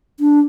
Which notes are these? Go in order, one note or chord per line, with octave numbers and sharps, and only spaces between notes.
D4